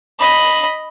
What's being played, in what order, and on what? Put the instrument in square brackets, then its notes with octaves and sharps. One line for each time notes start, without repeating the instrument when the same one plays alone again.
[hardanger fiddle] D#5 B5